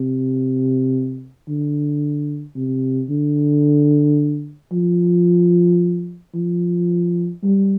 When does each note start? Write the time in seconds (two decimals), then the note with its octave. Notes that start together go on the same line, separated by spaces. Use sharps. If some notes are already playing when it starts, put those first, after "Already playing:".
Already playing: C3
1.48 D3
2.55 C3
3.10 D3
4.72 F3
6.35 F3
7.43 G3